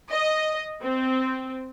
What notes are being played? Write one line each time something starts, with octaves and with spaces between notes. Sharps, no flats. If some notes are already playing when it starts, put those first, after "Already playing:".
D#5
C4